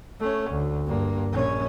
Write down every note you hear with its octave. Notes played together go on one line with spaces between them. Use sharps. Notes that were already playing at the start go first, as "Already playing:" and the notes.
A3 C#4
D2
G2 A#3
A#1 C#4